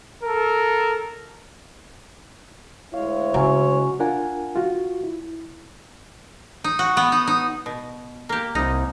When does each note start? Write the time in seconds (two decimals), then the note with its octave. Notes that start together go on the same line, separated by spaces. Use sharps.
0.22 A4 A#4
2.94 D2 G#3 E4 C#5 F5
3.34 C#3 F#3 C#4 E6
4.00 D4 F4 A#4 F#5 G#5
4.56 F4 F#4
5.04 E4
6.64 D#4
6.79 F#4
6.97 B3
7.12 D#4
7.27 D#4
7.66 B2
8.29 A#3 G4
8.55 C2 D#4